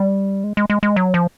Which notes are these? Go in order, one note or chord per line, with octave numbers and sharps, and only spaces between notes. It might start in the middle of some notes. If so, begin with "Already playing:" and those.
Already playing: G3
G#3
G#3
G#3
G#3
F#3
F3